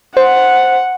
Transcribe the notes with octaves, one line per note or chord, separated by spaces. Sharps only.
C5 F#5